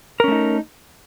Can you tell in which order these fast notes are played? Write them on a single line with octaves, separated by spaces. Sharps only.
A#4 C#4 A3 D#4